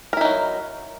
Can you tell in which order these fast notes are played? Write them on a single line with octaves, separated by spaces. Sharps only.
A#4 E4 D#4 F#3